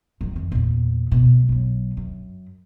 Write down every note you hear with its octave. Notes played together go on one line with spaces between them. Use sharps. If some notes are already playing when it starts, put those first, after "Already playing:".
D#3 F3
F2 E3
E2 A#2
B2
B1 F#3
F#2